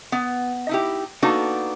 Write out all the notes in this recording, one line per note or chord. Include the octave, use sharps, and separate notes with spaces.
B3
D#4 E4 G4
A#3 B3 D4 D#4 F#4 A4